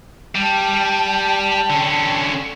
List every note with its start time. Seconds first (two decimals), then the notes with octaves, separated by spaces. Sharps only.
0.35 G3 G5 A5
1.70 D3 C#4